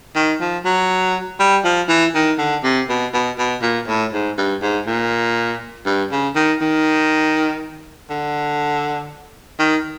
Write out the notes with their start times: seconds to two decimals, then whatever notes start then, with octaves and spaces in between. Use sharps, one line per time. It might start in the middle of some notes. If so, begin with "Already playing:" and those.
0.15 D#3
0.40 F3
0.65 F#3
1.39 G3
1.64 F3
1.88 E3
2.14 D#3
2.38 D3
2.63 C3
2.89 B2
3.13 B2
3.38 B2
3.62 A#2
3.87 A2
4.13 G#2
4.38 G2
4.62 G#2
4.86 A#2
5.86 G2
6.12 C#3
6.35 D#3
6.61 D#3
8.10 D3
9.59 D#3